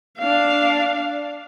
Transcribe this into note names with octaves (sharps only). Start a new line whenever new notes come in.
D4 F5